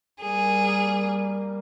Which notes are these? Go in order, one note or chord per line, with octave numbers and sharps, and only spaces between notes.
G3 A#3 G#4